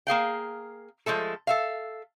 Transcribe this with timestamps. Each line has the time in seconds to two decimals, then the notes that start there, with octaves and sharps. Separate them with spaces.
0.07 A#3 G#4 F5 G5
1.06 F3 G#3 A3 A4
1.47 A4 E5 F5